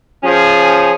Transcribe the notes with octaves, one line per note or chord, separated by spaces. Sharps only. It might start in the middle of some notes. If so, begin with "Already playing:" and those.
F3 C#4 G#4